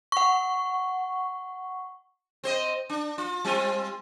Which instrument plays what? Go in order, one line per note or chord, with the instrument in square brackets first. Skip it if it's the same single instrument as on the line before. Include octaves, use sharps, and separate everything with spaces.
[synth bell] F#5 C#6
[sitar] C4 C5 D#5
D4
F4
G3 C4 F4